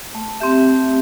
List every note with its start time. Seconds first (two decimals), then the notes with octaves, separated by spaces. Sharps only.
0.15 A3
0.40 C4 G4 E5
0.66 A3